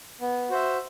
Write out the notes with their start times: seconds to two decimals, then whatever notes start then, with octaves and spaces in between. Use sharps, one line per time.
0.21 B3
0.50 F#4 C5 E5